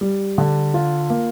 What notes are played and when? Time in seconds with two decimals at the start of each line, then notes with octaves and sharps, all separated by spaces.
0.01 G3
0.38 D3
0.74 F4
1.10 A#3